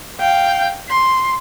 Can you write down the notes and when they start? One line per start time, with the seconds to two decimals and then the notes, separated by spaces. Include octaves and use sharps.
0.20 F5 G5
0.89 C6